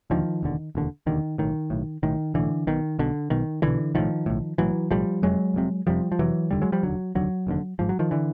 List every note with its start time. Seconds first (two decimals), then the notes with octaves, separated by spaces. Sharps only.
0.10 E1 D#2 D3 D#3 F3
0.43 E1 D#2 D3
0.75 E1 D#2 D3
1.06 E1 D#2 D3 D#3
1.38 B1 A2 D#3
1.70 B1 A2
2.03 B1 A2 D#3
2.34 B1 A2 D3 E3
2.67 B1 B2 D#3
2.99 B1 B2 D3
3.30 B1 B2 D#3
3.62 B1 B2 D3 E3
3.94 B1 A2 D#3 F3
4.26 B1 A2
4.58 B1 A2 E3 F#3
4.91 B1 A2 F3 G3
5.22 F1 F2 C3 F#3 G#3
5.54 F1 F2 C3
5.87 F1 F2 C3 F3 G3
6.12 F3
6.19 F1 F2 C3 E3 F#3
6.51 F1 D#2 D3 G3
6.62 F#3 G#3
6.72 F3 G3
6.83 F1 D#2 D3 F#3
7.15 F1 D#2 D3 F#3
7.47 F1 D#2 D3
7.79 G#1 G#2 F3
7.89 F#3
7.99 D#3 F3
8.11 D3 E3